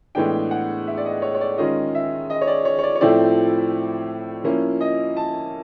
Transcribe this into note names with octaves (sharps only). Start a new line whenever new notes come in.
A2 E3 G#3 B3 D4 G5
F#5
E5
D5
D#5
C#5
C#5
D5
D#3 G#3 C#4 F4 D#5
E5
D#5
C#5
D5
C#5
C#5
D5
C#5
A2 F3 A3 C4 E4 D5
F3 A#3 C#4 E4
D#5
A5